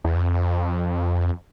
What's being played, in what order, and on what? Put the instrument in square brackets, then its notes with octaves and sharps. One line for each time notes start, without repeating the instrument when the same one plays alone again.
[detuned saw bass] E2
F2